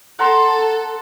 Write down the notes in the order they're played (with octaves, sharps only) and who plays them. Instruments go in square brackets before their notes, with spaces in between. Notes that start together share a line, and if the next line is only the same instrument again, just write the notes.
[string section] A4 [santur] F#5 A#5 C6